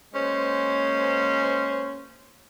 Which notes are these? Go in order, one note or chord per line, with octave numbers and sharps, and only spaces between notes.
G#3 A#3 C#4 C5